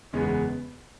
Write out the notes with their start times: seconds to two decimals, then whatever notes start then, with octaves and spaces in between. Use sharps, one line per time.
0.13 F#1 E2 C#3 G#3 B3